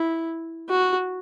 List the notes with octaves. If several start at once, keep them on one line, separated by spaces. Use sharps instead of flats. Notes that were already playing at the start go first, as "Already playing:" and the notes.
Already playing: E4
F#4